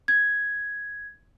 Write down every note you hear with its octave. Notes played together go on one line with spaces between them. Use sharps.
G#6